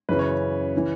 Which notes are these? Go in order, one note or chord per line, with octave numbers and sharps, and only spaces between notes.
F#2 C#3 E3 B4
C#5
C#5
C#3 E3